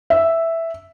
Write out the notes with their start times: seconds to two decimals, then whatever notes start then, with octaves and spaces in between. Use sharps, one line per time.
0.10 E5